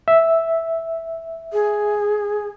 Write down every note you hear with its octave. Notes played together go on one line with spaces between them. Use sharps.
E5
G#4